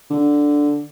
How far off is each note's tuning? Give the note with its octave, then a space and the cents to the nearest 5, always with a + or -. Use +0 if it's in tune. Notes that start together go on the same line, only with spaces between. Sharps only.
D3 -5